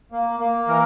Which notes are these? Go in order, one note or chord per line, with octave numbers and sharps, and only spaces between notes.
A#3
A#3
E3 A#4